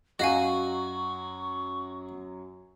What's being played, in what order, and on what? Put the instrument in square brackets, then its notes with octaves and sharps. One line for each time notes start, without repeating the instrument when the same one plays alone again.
[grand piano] F#2 F#3 [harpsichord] F#4 [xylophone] D#5 F5 G#5 [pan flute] C#6